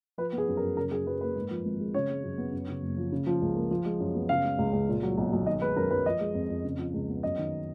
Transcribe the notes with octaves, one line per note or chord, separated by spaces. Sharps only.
F3 B4
B3
G#4
F#2
A#4
F#2
C#3 A#4
F#3 G#4
F#2 B4
A#3 B4
G#2
F3
G#1
G#3
C#3 C#5
G#3
F#2
B3
F#2
C#3
F#1
F3
C#3
F3
C#2
A#3
F3
G#3
F#2
B3
C#3 F5
G#3
C#2
C#2
A#2
F#3
B1
B1
D#3 D#5
G#3 B4
F#2 A#4
F#2 B4
F3 D#5
G#3
F2
F2
C#3
F3
C#2
B3
F#2 D#5
D#3